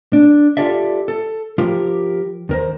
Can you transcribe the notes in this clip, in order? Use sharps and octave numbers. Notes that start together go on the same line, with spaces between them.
D4
F4 G4 A4 D5 E5
A4
F3 F4 G4 A#4
D#2 A#4 C5